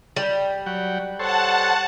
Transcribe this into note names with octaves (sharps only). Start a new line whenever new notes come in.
G3
F#3 F#5 G5
A4 C5 C#5 F#5 A5